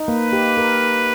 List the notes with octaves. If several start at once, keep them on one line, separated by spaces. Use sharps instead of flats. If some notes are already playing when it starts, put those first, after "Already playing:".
Already playing: D#4
A#3 B4
G4
A#4